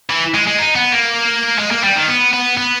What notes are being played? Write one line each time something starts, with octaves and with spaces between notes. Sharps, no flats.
E3
G#3
G#3
D#4
B3
A#3
G#3
A#3
G3
D#3
B3
B3
B3